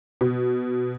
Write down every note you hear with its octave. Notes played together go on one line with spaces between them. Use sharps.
B2